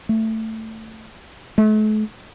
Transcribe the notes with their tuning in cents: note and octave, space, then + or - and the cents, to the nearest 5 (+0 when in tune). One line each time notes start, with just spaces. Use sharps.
A3 +15
A3 -40